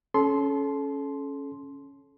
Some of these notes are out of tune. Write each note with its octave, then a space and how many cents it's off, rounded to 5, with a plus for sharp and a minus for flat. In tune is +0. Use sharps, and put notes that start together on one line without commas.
C#4 +0 A4 -30 C6 +0